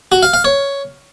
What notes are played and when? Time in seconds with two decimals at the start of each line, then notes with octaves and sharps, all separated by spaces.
0.12 F#4
0.23 F5
0.34 F5
0.44 C#5